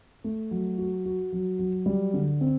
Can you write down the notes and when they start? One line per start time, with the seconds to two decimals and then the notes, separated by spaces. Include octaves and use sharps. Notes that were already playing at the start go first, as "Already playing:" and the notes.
0.24 A3
0.51 F#3
0.78 F#4
1.05 F#4
1.32 F#3
1.59 F#3
1.86 G3
2.14 D3
2.41 C4